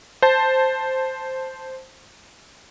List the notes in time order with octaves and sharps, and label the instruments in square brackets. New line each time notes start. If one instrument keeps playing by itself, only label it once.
[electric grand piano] C5 A5